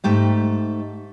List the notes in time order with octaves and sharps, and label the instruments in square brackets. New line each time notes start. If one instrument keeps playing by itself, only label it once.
[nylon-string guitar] G#2 A3 G4 D#5